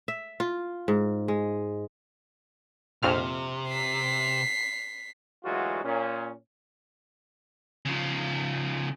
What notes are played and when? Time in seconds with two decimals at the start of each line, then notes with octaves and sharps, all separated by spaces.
0.08 E5
0.40 F4
0.88 G#2
1.28 G#3
3.03 A#1 F2 C3 F6
3.68 B6 C7
5.45 D2 E3 F#3 G#3 F4 F#4
5.84 A#2 C#4
7.85 C#3 F3